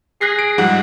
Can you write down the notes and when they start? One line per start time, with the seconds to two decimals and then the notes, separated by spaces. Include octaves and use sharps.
0.21 G#4 F#6 A#6 C7
0.39 D7
0.58 G#2 F3 G3 F#5